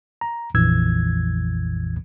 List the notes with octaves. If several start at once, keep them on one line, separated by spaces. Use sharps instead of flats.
A#5
A#1 F2 E3 E6 G#6